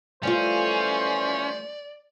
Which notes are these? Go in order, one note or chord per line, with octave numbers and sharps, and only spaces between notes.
E3 F3 G3 A3 C#4 F4 C5 D5